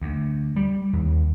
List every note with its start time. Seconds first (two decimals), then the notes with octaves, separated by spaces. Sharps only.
0.02 D2
0.56 G3
0.93 D#2